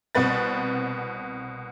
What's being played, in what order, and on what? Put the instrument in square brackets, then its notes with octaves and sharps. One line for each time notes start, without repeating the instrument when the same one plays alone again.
[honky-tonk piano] C2 B2 C4 B4 A6